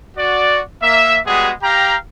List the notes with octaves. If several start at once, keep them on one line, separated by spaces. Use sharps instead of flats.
F#4 D5
A#3 E5
G3 G#3 B3 F#4 G#4
G4 F5 G5 A#5